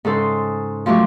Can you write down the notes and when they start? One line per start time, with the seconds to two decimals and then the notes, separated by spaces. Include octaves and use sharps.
0.05 G#2 C#3 A4 C5
0.86 F3 F#3 A3 G4 C#6